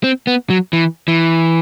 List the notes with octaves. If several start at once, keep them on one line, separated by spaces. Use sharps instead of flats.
C4
B3
F#3
E3
E3